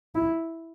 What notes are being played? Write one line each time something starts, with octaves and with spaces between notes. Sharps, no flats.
E4